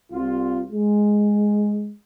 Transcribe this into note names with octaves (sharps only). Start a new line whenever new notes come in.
C2 F4
G#3